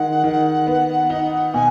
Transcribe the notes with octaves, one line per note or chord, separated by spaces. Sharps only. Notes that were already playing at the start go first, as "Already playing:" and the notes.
Already playing: D#3 G#3 F#5
D#3
B3
D#4
B2 G#5